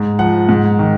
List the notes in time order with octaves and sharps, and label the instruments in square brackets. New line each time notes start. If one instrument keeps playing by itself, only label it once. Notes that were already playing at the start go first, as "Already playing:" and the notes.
Already playing: [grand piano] G#2
F3 F#5
G#2
D#3